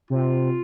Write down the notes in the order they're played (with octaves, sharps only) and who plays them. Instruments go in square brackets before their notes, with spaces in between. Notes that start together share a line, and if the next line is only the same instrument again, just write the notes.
[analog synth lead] C3 [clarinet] F4